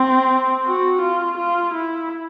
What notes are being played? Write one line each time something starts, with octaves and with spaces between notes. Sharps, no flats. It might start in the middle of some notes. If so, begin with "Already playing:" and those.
Already playing: C4
F#4
F4
F4
E4